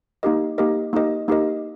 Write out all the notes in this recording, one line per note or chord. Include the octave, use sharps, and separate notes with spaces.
A#3 D#4 G4 A#4 D#5
A#3 D#4 G4 A#4 D#5
A#3 D#4 G4 A#4 D#5
A#3 D#4 G4 A#4 D#5